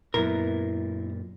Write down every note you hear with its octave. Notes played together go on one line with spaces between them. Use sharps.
F#2 A#2 B3 E4 A#4